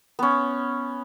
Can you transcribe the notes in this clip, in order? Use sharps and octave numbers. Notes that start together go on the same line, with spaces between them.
B3 C#4